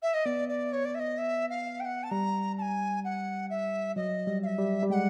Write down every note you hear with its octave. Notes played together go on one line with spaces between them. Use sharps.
E5
D#5
B3 D5
D5
C#5
D5
E5
D#5
E5
F5
G5
F#5
A5
G3 A#5
A5
G#5
F#5
E5
F#3 D#5
G3
F5
E5
G3
G3
G#3 F#5 G5